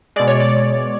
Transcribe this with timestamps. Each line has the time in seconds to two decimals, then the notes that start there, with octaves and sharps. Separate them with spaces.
0.16 B2 G#3 D5
0.28 C#5
0.40 D5